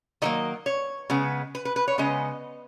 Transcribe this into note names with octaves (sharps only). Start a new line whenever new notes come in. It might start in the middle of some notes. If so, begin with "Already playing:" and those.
D#3 F#3 A#3 D#5
C#5
C#3 G#3 B3
B4
B4
B4
C#5
C#3 G#3 B3 D#5